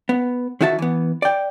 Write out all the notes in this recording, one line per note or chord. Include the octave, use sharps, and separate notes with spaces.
B3
D#3 E4 F#4 E5 A5
E3 B3
D5 G5